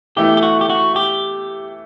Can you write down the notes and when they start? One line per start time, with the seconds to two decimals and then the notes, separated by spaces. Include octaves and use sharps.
0.16 E3 A3 E4 G4
0.37 G4
0.43 F#4
0.61 G4
0.70 F#4
0.96 G4